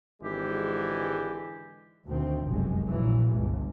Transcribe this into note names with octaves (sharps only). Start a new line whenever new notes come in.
G#1 D3 E3 G#3 G4
D2 B2 D#3 C4
F1 B1 F#2 G#3
A#1 A#2 E3 F#3
G1 C#2 G2